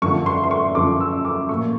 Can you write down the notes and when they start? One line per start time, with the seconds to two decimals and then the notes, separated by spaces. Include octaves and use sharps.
0.02 F#2 D3 F3 C#6
0.26 C6
0.44 C6
0.51 C#6
0.75 F#2 D3 F3 D6
1.00 E6
1.25 D6
1.49 A#2 F3 C#6